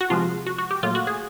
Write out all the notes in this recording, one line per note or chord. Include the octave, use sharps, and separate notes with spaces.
F#4
C3 F3 G#3 F4
F#4
F#4
G4
A#2 F#3 A3 F4
F#4
G#4